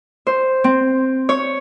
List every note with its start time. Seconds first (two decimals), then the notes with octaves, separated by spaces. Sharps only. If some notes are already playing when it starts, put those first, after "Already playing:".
0.27 C5
0.64 C4
1.29 C#5